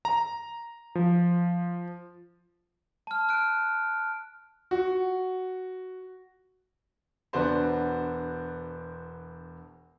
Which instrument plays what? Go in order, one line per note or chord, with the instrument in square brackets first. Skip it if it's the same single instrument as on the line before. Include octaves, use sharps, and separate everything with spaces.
[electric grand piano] A#5
F3
[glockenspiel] A5 F6
F6 F#6 D7
[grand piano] F#4
E1 B3 D4 F#4 C5 C6